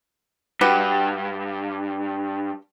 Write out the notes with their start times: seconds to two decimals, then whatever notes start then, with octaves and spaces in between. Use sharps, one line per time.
0.61 G2 F#4 G4 B4